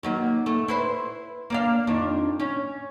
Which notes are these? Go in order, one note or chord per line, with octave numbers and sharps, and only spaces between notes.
D#3 F#3 A#3
A3
E4 B4 C5
A#3 D4 F5
F2 D#3 D4
C#4